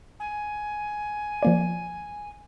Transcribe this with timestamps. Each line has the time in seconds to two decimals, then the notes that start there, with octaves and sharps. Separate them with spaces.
0.20 G#5
1.43 F3 A#3 D5